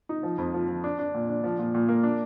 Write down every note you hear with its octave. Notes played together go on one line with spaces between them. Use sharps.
D#4
F3
F2
F3
F3
D4
D4
A#2
D4
F3
A#2
A#2
A#3
D4